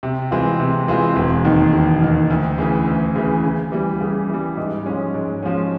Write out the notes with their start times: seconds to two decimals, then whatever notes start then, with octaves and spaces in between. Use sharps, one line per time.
0.03 C3
0.31 E3 G#3 C4 F4
0.60 C3
0.88 E3 G#3 C4 F4
1.16 E1
1.45 D#2 D#3
1.73 E1
2.02 D#2 D#3
2.30 D2
2.58 C#3 E3
2.87 D2
3.16 C#3 E3
3.44 C#3
3.72 E3 G3
4.01 C#3
4.29 E3 G3
4.57 G#2
4.86 F3 G#3 C#4
5.14 G#2
5.43 F3 G#3 C#4